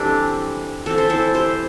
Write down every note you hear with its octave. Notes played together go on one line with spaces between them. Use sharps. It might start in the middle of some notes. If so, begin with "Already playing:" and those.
Already playing: E3 G3 C4 D4 G4 A4 C5
E3 A3 C4 A4
C5
E4 A4
G4 C5